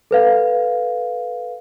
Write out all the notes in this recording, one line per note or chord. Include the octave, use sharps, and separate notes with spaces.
A4 B4 F5